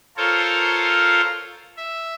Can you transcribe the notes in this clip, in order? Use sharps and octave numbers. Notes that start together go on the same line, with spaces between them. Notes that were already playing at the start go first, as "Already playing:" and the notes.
F4 A4 A#4 C5 C#5 F5
E5